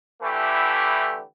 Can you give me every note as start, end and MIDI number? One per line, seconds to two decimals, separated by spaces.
0.22 1.21 50
0.22 1.21 52
0.22 1.21 57
0.22 1.21 64
0.22 1.21 67